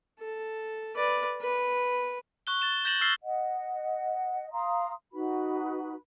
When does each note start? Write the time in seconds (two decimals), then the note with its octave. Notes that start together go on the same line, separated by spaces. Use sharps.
0.20 A4
0.96 B4 D5
1.41 B4
2.47 C#6 F#6 G7
2.60 A6 E7 G7
2.85 G6 A6 A#6 E7 F#7
3.01 E6 F6 A6 A#6 C7 G7
3.22 D#5 F#5
4.52 F5 A#5 C6 D#6
5.13 D#4 F#4 B4 B5